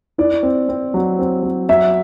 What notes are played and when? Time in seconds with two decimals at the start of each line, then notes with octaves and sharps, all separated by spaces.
0.18 E4 D5
0.43 C4
0.69 C4
0.94 F#3
1.19 C4
1.43 F#3
1.69 F#3 E5